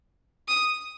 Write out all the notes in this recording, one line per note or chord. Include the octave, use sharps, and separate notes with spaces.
D#6